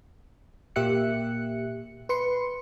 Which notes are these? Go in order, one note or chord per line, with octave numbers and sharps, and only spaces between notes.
A#2 A#3 G4 E5 F#6 C#7
B4 C6 C#7